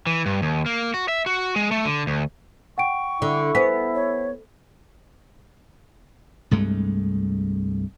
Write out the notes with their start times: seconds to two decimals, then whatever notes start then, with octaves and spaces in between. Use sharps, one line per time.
0.07 E3
0.26 G2
0.42 D#2
0.66 A#3
0.94 F#4
1.08 E5
1.26 F#4
1.56 G#3
1.71 A3
1.85 D3
2.07 D2
2.78 F#5 G5 C#6 D7
3.22 D3 E4
3.55 B3 C5 G#5 B6
3.95 C#5
6.51 C2 G2 G#3 A3